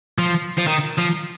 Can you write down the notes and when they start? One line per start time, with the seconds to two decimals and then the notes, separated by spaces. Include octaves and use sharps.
0.18 F3
0.57 F3
0.67 D#3
0.98 F3